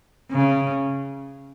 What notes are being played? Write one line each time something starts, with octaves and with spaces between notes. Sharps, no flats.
C#3